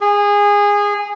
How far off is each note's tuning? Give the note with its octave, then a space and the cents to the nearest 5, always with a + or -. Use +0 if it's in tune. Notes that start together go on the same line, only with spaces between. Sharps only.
G#4 -20